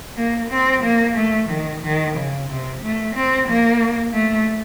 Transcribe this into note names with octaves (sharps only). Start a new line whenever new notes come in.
A#3
C4
A#3
A3
D#3
D#3
C#3
C3
A3
C4
A#3
A3